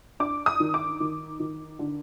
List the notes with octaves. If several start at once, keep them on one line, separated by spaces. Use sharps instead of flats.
D4 D6
D#6
D#3
D6
D#3
D#3
D3